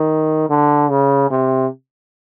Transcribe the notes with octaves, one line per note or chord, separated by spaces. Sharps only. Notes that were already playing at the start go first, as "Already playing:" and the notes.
Already playing: D#3
D3
C#3
C3